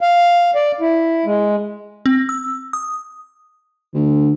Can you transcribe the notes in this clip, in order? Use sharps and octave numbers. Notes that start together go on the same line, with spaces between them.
F5
D5
E4
G#3
C4
E6
D#6
D2 D3